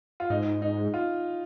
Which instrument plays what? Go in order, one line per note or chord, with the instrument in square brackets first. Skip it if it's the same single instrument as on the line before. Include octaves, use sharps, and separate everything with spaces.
[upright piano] F4
[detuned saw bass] G#2 [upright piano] D#4
[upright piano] D#4
F4